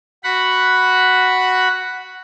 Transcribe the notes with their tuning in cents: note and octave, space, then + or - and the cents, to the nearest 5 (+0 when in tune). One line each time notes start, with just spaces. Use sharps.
F#4 +0 F#5 +0 B5 +0